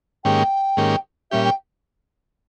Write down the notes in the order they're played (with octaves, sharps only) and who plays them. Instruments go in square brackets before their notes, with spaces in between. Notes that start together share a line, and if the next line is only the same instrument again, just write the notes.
[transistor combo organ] G#2 D#3 A#3 C#4 G4 [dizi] G5
[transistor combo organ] G#2 D#3 A#3 C#4 G4
[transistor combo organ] A#2 G3 C#4 G4 [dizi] E5
[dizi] G5